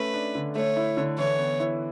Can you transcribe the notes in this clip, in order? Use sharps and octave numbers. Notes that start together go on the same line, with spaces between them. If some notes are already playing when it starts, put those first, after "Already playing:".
Already playing: A3 C#4 B4
D4
D3
A3 C#5
E4
D3
E3 C#5
B3
E4